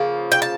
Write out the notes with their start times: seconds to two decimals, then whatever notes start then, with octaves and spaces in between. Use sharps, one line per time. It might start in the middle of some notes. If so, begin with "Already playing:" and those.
Already playing: C#3 F3 A#3
0.32 G5
0.42 A5